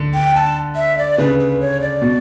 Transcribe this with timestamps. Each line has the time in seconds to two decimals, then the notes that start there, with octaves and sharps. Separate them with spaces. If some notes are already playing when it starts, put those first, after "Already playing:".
Already playing: D3
0.14 G5
0.35 A5
0.76 E5
0.98 D5
1.18 C#3 B4
1.40 B4
1.60 C#5
1.81 D5
2.02 B2